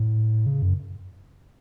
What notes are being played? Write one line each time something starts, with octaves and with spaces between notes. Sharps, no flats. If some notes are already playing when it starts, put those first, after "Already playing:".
Already playing: A2
C#3
F#2